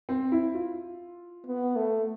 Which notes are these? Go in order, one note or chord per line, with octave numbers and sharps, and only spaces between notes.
C4
E4
F4
B3
A3